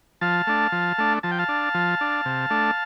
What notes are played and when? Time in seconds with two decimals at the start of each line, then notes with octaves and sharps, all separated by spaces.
0.21 F3 F5 A5
0.47 A3 D4
0.72 F3
0.98 A3 D4
1.23 F3 A5
1.31 G5
1.39 F5 A5
1.49 D4
1.74 F3
2.01 D4
2.25 C3
2.51 A3 D4